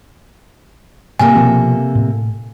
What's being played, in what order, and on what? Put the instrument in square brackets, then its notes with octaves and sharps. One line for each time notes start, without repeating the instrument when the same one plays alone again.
[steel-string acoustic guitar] C3 A#3 A4 [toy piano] G#5
[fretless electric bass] B2 F3 C4
A2